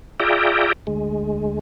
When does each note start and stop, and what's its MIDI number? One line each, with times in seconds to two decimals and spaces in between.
0.20 0.73 65
0.20 0.73 68
0.20 0.73 74
0.20 0.73 76
0.20 0.73 79
0.20 0.73 82
0.87 1.59 38
0.87 1.59 56